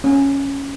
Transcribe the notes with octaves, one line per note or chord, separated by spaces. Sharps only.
C#4